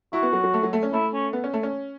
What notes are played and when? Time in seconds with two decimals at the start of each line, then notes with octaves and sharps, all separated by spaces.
0.13 E4 F#4
0.23 B3
0.33 F#3
0.44 F#3
0.54 A3
0.63 F#3
0.73 A3
0.83 C#4
0.93 A3 E4
1.14 C#4
1.33 B3
1.44 C#4
1.54 A3
1.63 C#4